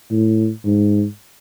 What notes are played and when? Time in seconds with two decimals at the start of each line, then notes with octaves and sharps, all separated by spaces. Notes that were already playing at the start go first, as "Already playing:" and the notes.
0.11 A2
0.66 G#2